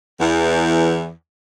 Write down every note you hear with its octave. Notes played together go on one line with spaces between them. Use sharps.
E2